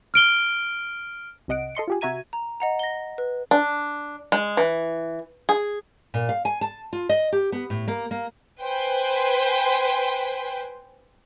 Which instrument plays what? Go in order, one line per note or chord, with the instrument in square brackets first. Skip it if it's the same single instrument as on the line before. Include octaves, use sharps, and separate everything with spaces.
[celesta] F6 D7 G7
[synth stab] C2 C3 D#5 F#5 D7
A4 D#5 C6 C#7
F4 G4 G#4
C3 F#4 E5 A#5 G#6 D#7
[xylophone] A#5
D#5 F#5 A#5
A#6 G7
B4
[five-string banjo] D4
G#3
E3
G#4
[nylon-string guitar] A#2
F5
G#5
A5
F4
D#5
G4
B3
A2
A#3
A#3
[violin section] B4 C5 G5 G#5